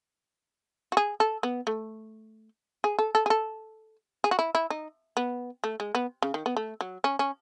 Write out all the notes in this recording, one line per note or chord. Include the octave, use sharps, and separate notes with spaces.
F#4
G#4
A4
B3
A3
G#4
A4
A4
G#4
A4
G#4
F#4
E4
E4
D#4
B3
A3
G#3
B3
C#3
D#3
B3
A3
F#3
C#4
C#4